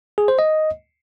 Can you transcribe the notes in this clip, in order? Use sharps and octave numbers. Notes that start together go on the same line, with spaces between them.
G#4
C5
D#5